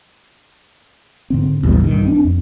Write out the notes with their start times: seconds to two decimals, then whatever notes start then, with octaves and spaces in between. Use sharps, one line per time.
1.30 G#2 D3 C4
1.63 A1 D#2 B2 G3
1.84 B1 G2 D#3
2.06 C4 D4
2.24 F2